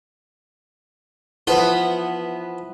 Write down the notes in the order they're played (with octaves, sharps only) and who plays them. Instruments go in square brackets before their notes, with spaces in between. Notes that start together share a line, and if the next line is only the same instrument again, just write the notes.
[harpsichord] F3 B4 C6 [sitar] B3 [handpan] E4